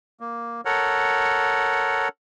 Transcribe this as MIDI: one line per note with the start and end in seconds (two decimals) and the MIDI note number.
0.20 0.61 58
0.65 2.08 69
0.65 2.08 70
0.65 2.08 73
0.65 2.08 78